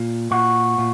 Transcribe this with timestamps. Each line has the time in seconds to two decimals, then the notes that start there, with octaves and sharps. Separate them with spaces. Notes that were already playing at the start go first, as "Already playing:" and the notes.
Already playing: A#2
0.31 A#2 F#4
0.78 A#2